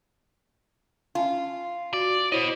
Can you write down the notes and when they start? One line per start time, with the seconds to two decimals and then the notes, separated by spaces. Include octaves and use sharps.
1.15 C#4 F4 G#5 A5
1.93 F#4 D5
2.32 B3 E4 C5 C#5 D#5